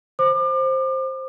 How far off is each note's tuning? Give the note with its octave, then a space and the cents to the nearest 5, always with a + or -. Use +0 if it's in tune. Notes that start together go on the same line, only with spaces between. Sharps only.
C5 +10 D6 +35